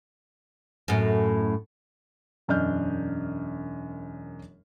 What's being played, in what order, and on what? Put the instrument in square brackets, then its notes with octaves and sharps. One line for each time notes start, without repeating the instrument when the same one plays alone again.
[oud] F#2 A2
[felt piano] E1 F#2 D4 D#5 F6 G6